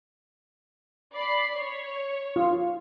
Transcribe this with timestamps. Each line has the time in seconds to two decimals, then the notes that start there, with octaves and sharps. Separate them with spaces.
1.14 D5 B5 C7
1.56 C#5
2.36 F4